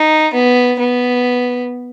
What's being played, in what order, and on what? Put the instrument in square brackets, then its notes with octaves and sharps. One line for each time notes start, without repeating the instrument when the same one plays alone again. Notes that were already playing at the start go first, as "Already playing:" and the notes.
Already playing: [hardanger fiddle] D#4
B3
B3